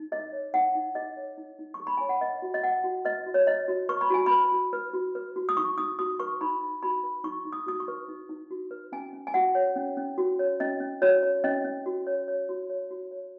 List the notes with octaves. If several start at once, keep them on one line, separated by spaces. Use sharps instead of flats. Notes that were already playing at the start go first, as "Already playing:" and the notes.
Already playing: D#4
G#4 D#5
C#5
D#4 F#5
D#4
G#4 D#5
C#5
D#4
D#4
C#6
G#4
B5
C#5 G#5
F#5
B4 D#5
F#4
D#5
B4 F#5
F#4
B4 D#5
F#4
C#5
B4 D#5
F#4
B4 C#6
B5
F#4 G#5
B4 B5
F#4
B4
F#4
B4
F#4
D#6
D#4 C#6
D#4 D#6
F#4 D#6
B4 C#6
D#4 B5
D#4
F#4 B5
B4
D#4 C#6
D#4
D#6
F#4 D#6
C#6
B4
D#4
D#4
F#4
B4
C#4 G#5
C#4
G#5
F#4 F#5
C#5
C#4
C#4
F#4
C#5
C#4 D#5
C#4
F#4 C#5
C#5
C#4 D#5
C#4
F#4
C#5
C#5
F#4
C#5
F#4
C#5